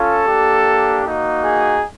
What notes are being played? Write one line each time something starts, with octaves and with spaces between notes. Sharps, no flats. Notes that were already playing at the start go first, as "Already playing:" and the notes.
Already playing: C#4 F4 A4
A#3 D4 G4
A#3 D#4 F#4
G#4